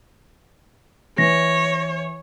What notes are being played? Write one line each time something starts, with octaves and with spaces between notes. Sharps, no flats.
E3 C#5 A#6